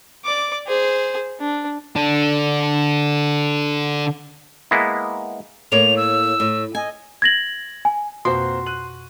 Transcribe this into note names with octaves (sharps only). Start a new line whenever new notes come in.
D5 D6
G#4 C5
D4
D3 D4
G#3 A#3 B3 E4
A2 A#3 C#5 F7
E6
A2
D#5 G#5
G#6 A#6 F#7
G#5
F2 B2 A#3 C4 F#4 C5 C6
F#6 D#7 F#7